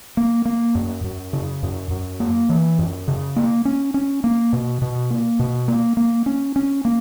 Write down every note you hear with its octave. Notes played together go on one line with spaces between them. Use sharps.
A#3
A#3
F#2
F#2
C#3
F#2
F#2
A#3
E3
F#2
C#3
A#3
C#4
C#4
A#3
B2
B2
A#3
B2
A#3
A#3
C#4
C#4
A#3